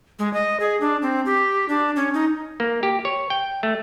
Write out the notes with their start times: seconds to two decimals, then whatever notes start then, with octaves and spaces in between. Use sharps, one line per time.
0.19 G#3
0.34 D#5
0.60 G#4
0.81 D4
1.02 C4
1.26 G4
1.69 D4
1.96 C#4
2.14 D#4
2.60 A#3
2.83 G4
3.05 C#5
3.30 G5
3.63 A3